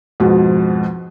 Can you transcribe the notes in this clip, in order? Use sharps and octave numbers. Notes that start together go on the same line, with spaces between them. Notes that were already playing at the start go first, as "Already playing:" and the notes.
F2 G#2 B2